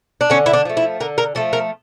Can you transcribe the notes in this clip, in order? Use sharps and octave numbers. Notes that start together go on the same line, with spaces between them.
D4
D3 C#4
E4
D4
F3 A3
E4
D3 A#4
A#4
F3 A3 A4
A#4